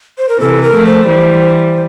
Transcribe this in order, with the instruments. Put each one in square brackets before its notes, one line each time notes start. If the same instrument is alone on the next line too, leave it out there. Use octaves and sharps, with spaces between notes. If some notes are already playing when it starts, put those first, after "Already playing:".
[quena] C5
A#4
[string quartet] C3 E3 [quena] A4
[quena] A#4
[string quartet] F3 A3
[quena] C5
[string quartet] E3 G3